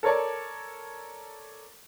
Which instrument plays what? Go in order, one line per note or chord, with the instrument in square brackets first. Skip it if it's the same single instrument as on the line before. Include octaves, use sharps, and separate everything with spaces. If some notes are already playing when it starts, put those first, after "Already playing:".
[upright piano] A4 A#4 C#5 D5 A5